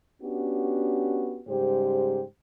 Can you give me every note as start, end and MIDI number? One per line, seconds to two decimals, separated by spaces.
0.22 1.41 59
0.22 1.41 61
0.22 1.41 62
0.22 1.41 66
0.22 1.41 67
1.47 2.22 44
1.47 2.22 49
1.47 2.22 55
1.47 2.22 67
1.47 2.22 72